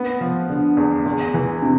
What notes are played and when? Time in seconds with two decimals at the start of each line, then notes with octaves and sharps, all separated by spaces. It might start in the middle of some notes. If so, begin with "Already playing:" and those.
Already playing: B3
0.21 F3
0.50 D3
0.77 E2
1.05 E2
1.34 E3
1.62 C3